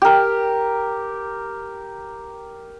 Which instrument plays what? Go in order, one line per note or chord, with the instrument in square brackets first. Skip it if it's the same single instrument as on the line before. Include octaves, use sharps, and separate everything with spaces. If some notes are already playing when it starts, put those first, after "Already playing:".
[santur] G4 A#4